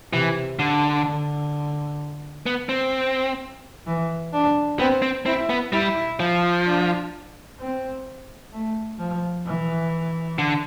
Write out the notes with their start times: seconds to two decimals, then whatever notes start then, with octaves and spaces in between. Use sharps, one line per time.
0.13 C3 E3
0.59 D3
1.06 D3
2.46 B3
2.69 C4
3.87 E3
4.33 D4
4.79 B3 C4
5.02 C4
5.26 C4 E4
5.50 B3
5.73 G3 E4
6.20 F3
6.66 D4
7.60 C4
8.52 A3
8.99 F3
9.46 E3
10.38 D3